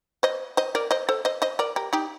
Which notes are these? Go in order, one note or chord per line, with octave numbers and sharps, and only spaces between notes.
C5 D#5
C5 D#5
A#4 D5
C5 D#5
A4 C5
C5 D#5
C5 D#5
A#4 D5
G4 A#4
D#4 G4